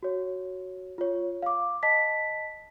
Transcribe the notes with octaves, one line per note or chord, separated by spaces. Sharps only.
F#4 C#5
F4 C#5
F5 D6
D#5 A5 B6